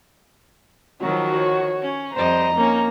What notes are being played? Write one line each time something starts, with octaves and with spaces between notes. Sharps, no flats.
D#3 F3 F#3 F#4
C#5
C#4
F2 G3 C5 D#5 A#5
A#3 C#4 D#4